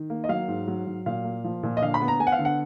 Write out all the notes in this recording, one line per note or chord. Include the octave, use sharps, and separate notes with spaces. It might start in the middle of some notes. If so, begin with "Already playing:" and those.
Already playing: D#3
A#3
D#5
F#3 F5
G#2
F#3
F#3
A#2 F5
A#3
F3
A#2
D#5
D3 F5
B5
B3
A#5
B3 G#5
F#5
F5
D3
F#5